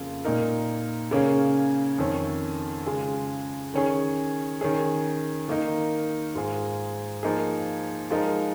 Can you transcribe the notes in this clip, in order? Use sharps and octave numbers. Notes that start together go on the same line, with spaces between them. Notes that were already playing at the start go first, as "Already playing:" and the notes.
Already playing: F2 C#3 A#3 F4
A#2 A#3 D#4 A#4
C#3 A#3 C#4 G#4
F2 D#3 C#4
C#3 G#3 F4 G#4
D#3 C#4 G#4
D#3 C#4 G#4
D#3 A#3 D#4 A#4
G#2 G#3 F4 G#4
F3 A#3 D#4 G#4
F3 G#3 D#4 A#4